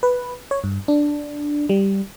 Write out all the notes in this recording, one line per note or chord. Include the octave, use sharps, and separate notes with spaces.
B4
C#5
G2
D4
G3